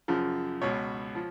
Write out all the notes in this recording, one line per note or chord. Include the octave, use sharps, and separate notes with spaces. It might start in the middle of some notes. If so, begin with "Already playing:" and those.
F#2 C#3 F3
C#2 B2 C#5
F3